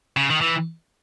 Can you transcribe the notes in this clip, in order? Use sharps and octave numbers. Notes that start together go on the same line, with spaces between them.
C#3
D#3
E3